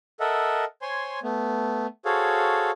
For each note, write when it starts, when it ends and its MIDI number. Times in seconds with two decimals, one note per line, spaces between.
0.20 0.65 69
0.20 0.65 70
0.20 0.65 75
0.20 0.65 76
0.20 0.65 78
0.82 1.19 72
0.82 1.19 73
0.82 1.19 80
0.82 1.19 84
1.23 1.87 57
1.23 1.87 59
2.05 2.71 66
2.05 2.71 68
2.05 2.71 69
2.05 2.71 72
2.05 2.71 73
2.05 2.71 77